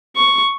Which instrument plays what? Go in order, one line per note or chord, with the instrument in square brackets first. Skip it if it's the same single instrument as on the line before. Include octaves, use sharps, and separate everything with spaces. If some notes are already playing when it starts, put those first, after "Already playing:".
[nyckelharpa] C#6